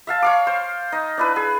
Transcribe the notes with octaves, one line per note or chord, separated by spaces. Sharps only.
E5 F5 A5
C#5 F5 D6
C5
D#4
D4 E4 B4
G#4